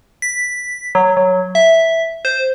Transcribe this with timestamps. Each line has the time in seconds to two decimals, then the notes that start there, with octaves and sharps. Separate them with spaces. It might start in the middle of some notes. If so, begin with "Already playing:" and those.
0.22 B6
0.95 F#3
1.17 F#3
1.55 E5
2.25 C5